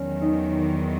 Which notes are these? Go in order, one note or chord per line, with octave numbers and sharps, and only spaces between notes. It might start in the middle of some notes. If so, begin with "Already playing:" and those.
Already playing: E2 D#3 F#3 C#4
D#4